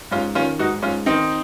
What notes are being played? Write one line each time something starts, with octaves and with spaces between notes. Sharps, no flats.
G#2 C#4 F4
D#3 C#4 F4
G#2 D#4 F#4
G#2 C#4 F4
D#3 C4 D#4